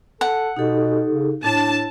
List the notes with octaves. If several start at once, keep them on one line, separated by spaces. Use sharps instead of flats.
A4 F#5
B2 D#4 G4 A4
C#3
A2 D4 A5